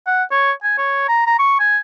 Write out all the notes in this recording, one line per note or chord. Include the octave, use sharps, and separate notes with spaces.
F#5
C#5
G#5
C#5
A#5
A#5
C#6
G#5